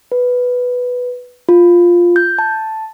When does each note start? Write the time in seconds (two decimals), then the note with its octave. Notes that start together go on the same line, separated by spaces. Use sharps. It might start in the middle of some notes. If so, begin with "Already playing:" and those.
0.12 B4
1.49 F4
2.16 G6
2.39 A5